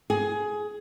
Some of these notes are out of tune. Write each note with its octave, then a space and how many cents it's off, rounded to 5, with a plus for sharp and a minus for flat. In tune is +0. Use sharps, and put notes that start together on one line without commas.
G#4 +15